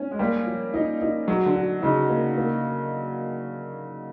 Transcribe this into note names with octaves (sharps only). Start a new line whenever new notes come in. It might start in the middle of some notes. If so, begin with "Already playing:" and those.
Already playing: C#4
G#3
G3 A#3
F3
D#4
D#4
F#3 F#4
D3
F#4
C#3 D#4
A#3
A#3